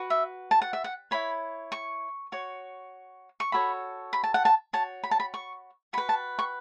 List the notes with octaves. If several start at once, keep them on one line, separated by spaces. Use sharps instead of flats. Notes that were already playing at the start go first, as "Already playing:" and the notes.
Already playing: F#4 B4
E5
A5
F#5
E5
F#5
E4 C#5 B5
C#6
F#4 C#5
C#6
F#4 A4 C#5 B5
B5
A5
F#5
A5
F#4 C#5 A5
B5
A5
B5
C#6
F#4 B4 B5
A5
C#6